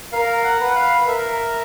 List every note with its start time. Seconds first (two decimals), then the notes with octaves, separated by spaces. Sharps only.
0.12 A#4 F5
0.44 F#5
0.59 B4
0.66 F#5
0.75 F5
1.07 A#4 E5